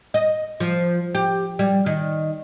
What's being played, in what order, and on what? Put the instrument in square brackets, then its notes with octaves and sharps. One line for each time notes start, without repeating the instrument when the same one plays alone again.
[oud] D#5
F3
G4
G3
D#3